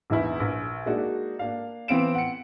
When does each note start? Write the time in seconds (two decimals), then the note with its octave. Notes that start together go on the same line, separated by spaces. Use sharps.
0.10 A#1 E2 D#4 E4
0.40 A#1
0.86 G#3 A#3 D4 D#4 F#4
1.39 A#3 D4 F5
1.88 E3 B3 C4 F5 D7 E7
2.15 F#5 C#7